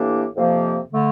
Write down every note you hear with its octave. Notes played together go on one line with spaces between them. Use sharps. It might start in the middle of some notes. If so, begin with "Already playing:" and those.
Already playing: A2 E3 A#3 D4 G4
F2 C3 F3 A#3
D3 A3